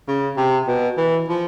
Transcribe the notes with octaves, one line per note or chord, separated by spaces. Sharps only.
C#3
C3
B2
E3
F3